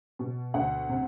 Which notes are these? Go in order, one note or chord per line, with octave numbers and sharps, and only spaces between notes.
B2
D2 F#5
C3